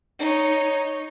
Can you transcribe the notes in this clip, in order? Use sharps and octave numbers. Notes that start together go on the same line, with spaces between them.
D#4 C#5